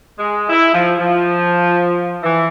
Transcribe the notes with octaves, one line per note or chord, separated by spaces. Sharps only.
G#3
E4
F3
F3
E3